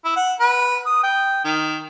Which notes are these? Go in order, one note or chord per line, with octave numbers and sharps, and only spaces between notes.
E4
F#5
B4
D#6
G5
D#3